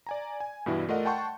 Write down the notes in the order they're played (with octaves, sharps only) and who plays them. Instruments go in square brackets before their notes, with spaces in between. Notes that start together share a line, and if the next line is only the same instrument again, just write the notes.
[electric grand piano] D5 G#5 A#5
G#5
G2 B2 E3 G3 E4
A3 F4 A#4 D5 D#5 F#5
F#5 G5 A5 C6 C#6 G6